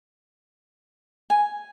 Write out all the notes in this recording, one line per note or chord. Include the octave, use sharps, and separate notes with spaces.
G#5